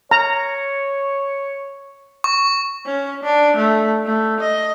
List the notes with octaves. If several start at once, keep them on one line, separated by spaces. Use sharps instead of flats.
C#5 A#5
C#6
C#4
D4
A3
A3
D#5